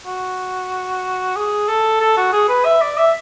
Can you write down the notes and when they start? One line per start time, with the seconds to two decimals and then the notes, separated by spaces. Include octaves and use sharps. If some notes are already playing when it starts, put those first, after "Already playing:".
0.06 F#4
1.36 G#4
1.68 A4
2.00 A4
2.17 F#4
2.33 G#4
2.49 B4
2.65 E5
2.82 D5
2.98 E5